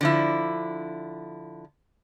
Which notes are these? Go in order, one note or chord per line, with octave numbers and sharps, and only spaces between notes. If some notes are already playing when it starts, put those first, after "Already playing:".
D3 F3 E4